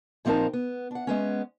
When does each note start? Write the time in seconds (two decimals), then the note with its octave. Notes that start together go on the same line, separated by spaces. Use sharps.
0.25 A#2 F3 C4 D#4 A#4 A5
0.53 B3
0.91 D4 F#5
1.07 G#3 B3 C#4